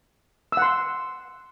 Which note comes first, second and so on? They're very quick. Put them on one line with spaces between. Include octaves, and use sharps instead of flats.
E6 F#5 C6